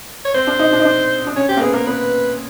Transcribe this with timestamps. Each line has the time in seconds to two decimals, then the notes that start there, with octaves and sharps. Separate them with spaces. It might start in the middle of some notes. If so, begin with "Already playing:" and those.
0.25 C#5
0.34 C4 C5
0.47 D4
0.59 D#4
0.72 D4
0.79 D#4
0.85 D4
1.27 D4
1.36 C#4 C#5
1.49 C4 G4
1.57 A#3
1.61 B3 G#4
1.74 A#3 A#4
1.86 B3 B4